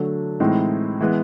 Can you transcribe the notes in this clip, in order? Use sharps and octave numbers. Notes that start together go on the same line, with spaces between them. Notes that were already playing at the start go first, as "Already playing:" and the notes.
Already playing: D3 F#3 A3 D4
A2 E3 G#3 C4 D#4
E3 G#3 B3